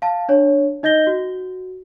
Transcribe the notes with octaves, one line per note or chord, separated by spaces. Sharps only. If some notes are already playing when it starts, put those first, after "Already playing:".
F5 A5
D4 C#5
D#4 D#5 G6 A#6 G7
F#4